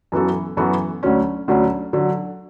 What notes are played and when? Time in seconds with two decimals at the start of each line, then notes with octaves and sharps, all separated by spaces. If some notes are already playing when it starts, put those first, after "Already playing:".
0.12 F#2 E3 B3 F#4 A4
0.57 F#2 E3 B3 F#4 A4
1.03 D2 D3 F#3 C#4
1.48 D2 D3 F#3 C#4
1.93 D3 F#3